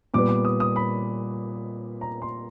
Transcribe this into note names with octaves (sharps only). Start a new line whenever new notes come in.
A#2 G3 B3 D6
D6
D#6
D#6
B5
A#5
C6